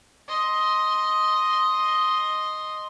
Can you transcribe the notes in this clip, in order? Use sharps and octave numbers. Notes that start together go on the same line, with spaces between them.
D#5 C6